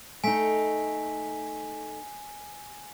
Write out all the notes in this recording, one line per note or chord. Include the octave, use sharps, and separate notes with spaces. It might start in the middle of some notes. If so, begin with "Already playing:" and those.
A3 D#4 G#5 B6